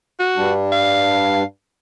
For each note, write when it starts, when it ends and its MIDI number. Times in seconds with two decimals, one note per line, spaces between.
0.20 0.51 66
0.37 1.43 43
0.37 1.43 55
0.37 1.43 62
0.72 1.43 77